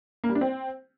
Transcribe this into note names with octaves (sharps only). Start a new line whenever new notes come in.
A#3
G3
D4
C4